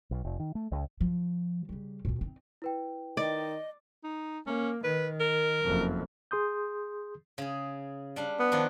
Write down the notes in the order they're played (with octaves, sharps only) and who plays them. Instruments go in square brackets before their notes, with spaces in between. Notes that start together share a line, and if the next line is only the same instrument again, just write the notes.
[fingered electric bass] B1
F1
D#3
A3
C#2
[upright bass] F3
C#3 G3
D2 A#2
C4 D#4
[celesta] E4 B4 G5
[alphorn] D#3 [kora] D5 [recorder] D#5
[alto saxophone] D#4
[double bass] A#3 [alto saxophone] C#4
[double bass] D#3 [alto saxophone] B4
[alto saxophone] A#4
[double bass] F#1 F2
[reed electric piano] G#4 C6 D#6 G6
[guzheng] C#3 G#4
G3 D4 F5
[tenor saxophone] B3
[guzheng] D#3 F3 D4